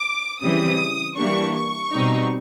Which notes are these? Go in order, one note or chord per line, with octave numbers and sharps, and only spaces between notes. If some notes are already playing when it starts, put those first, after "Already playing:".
Already playing: D6
C#3 E3 G3 C4 D#6
E3 G3 A#3 D4 C#6
C#6
B2 G3 C4 D#4